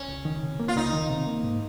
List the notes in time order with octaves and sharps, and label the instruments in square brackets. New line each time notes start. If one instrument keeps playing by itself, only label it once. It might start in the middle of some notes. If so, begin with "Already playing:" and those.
Already playing: [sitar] C#4
[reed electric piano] C#2
D#3
C3
A#3
[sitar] F4
[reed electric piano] C#2 [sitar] D#4
[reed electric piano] D#3
C3
A#3
G#2